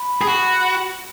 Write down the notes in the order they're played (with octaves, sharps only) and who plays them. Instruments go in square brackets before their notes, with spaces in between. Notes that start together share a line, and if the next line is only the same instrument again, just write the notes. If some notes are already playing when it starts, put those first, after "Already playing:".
Already playing: [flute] B5
[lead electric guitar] G#4
F#4